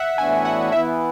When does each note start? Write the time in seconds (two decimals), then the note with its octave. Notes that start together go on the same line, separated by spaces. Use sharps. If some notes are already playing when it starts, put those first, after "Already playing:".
Already playing: E5 F#5
0.18 A2 E3 B3 D4 F#4 G#5
0.45 F#5
0.72 E3 B3 E4 E5